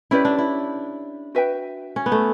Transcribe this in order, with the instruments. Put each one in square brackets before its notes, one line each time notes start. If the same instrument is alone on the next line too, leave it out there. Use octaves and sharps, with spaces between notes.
[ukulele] C#4 G4 B4 D5 [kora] E4
[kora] D4
E4
[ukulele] F#4 B4 E5 G5
[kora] C#4
B3
A3